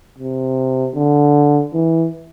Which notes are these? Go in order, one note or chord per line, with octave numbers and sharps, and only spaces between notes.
C3
D3
E3